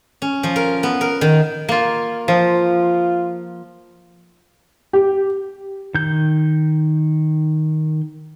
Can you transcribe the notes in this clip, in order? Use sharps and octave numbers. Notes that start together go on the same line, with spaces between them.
C#4
F3
A#4
B3
A#4
D#3
A#3 F4
F3 F4
G4
D#3 G6